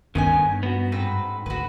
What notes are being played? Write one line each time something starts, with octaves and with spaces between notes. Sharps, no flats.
G2 D3 D#3 B3 C#4 D#4 G#5
B3 F#4
G#2 C4 F#4 B4
A1 D3 F#4 B4